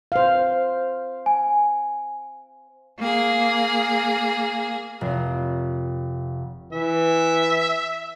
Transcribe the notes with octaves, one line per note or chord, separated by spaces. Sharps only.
C5 F5
G#5
A#3 G#4
F1
E3 E5